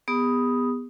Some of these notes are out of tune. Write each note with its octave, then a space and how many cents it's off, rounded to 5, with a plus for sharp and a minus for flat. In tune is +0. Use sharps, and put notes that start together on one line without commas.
B3 +0 G#4 -45 D#6 +5